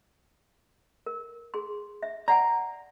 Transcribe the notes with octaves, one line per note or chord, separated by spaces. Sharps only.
A#4
G#4 C6
E5
D5 F#5 G#5 A#5